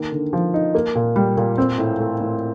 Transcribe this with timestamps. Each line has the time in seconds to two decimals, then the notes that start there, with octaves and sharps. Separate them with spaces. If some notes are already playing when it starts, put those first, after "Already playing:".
Already playing: D#3 A#3
0.12 D3
0.33 F3
0.54 D#4
0.75 A#3
0.95 A#2
1.16 G3
1.37 A#2
1.58 C4
1.78 A2
1.99 A3
2.20 A2